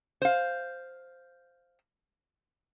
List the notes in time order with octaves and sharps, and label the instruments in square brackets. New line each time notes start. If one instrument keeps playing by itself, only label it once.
[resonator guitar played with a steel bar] C5 F5